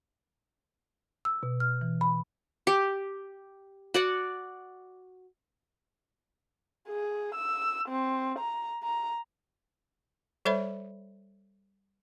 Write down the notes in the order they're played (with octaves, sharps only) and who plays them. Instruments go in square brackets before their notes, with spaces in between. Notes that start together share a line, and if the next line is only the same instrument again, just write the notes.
[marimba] E6
B2
F6
E3
B5
[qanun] G4
F#4 D5 F#5
[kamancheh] G#4
E6
C4
A#5
A#5
[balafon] G3 A4 C5 C#5 E5 B5